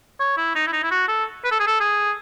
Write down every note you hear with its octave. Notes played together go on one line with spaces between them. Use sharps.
C#5
E4
D#4
E4
D#4
E4
F#4
A4
B4
A4
G#4
A4
G#4